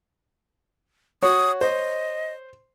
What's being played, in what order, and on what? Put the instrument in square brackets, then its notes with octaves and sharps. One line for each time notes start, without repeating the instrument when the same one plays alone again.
[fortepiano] F#4 [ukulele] C#5 [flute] D#6
[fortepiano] C5 [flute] D#5